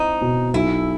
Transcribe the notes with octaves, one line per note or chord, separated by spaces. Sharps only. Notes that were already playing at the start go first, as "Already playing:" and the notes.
Already playing: C4 D#4 E4
B2
B1 E4